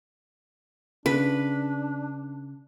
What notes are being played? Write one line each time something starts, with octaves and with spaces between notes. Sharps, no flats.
C#3 D4 B4